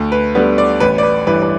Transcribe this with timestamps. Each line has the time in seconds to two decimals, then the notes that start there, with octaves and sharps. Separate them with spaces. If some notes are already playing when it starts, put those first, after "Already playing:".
Already playing: D2
0.12 B4
0.35 D3 G3 B3
0.58 D5
0.80 A1 B4
0.98 D5
1.03 B4
1.27 G2 E3 B4
1.43 B4